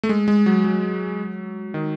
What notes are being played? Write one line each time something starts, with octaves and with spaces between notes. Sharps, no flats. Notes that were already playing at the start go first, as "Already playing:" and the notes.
A3
G#3
G#3
F#3
F#3
D#3